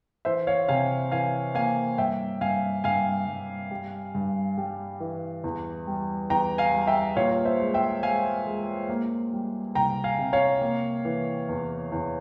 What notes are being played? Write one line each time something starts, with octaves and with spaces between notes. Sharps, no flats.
E3 C5 E5
C#5 F5
C3 F5 G#5
E3 F5 G#5
A#3 F5 G#5
G2 E5 G5
G2 F5 G#5
G2 F5 G#5
G2
G3
G2
G3
E3
E2
G3
E2 G5 A#5
F5 G#5
G3
E5 G5
A#2 C#5 F5
C5 E5
G#3
E5 G5
G#3 F5 G#5
G#3
A#3
G3
C2 G5 A#5
F5 G#5
C3
C#5 F5
A#3
E3
E2
E2